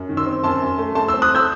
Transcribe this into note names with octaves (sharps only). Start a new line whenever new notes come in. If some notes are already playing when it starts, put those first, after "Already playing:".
Already playing: F#2
D#3
C6 E6
C4
F#2 A5 C6
F#2
A3
A3 A5 C6
C4 C6 E6
D#6 F#6
E6 G6